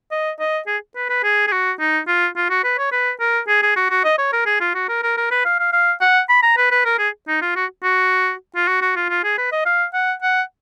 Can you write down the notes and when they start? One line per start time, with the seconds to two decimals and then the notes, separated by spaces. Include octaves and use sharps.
0.11 D#5
0.40 D#5
0.67 G#4
0.95 B4
1.09 B4
1.23 G#4
1.47 G#4
1.52 F#4
1.80 D#4
2.07 F4
2.36 F4
2.50 F#4
2.64 B4
2.78 C#5
2.92 B4
3.20 A#4
3.48 G#4
3.63 G#4
3.76 F#4
3.90 F#4
4.04 D#5
4.18 C#5
4.32 A#4
4.46 G#4
4.60 F4
4.74 F#4
4.88 A#4
5.03 A#4
5.17 A#4
5.31 B4
5.45 F5
5.59 F5
5.72 F5
6.01 F#5
6.29 B5
6.42 A#5
6.57 B4
6.71 B4
6.85 A#4
6.99 G#4
7.28 D#4
7.42 F4
7.55 F#4
7.83 F#4
8.56 F4
8.67 F#4
8.82 F#4
8.96 F4
9.09 F4
9.24 G#4
9.38 B4
9.52 D#5
9.65 F5
9.93 F#5
10.22 F#5